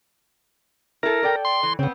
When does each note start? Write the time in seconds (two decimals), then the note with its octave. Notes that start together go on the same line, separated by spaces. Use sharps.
1.03 E4 A4 A#4
1.23 A4 D5 G5
1.45 C6
1.63 E3
1.79 C#3 B3 C4